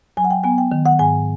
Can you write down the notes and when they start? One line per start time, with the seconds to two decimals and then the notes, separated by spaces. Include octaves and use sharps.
0.17 F#3 G#5
0.24 F#5
0.30 G5
0.44 B3 G#5
0.58 G5
0.72 D#3
0.86 F#5
0.99 G#2 G#5